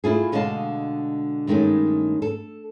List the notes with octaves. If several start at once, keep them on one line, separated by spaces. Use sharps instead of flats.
A3 E4 F4 G#4
B2 D3 G#3 D#5 F5 A5
G2 D#3 G#3 A3 C#4
A4